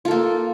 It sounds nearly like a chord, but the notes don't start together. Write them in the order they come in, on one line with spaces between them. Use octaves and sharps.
F4 A4 A#3